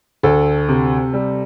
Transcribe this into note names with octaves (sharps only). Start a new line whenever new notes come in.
D2 A4
C3
G3